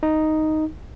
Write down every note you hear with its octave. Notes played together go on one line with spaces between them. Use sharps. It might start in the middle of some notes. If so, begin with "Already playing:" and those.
D#4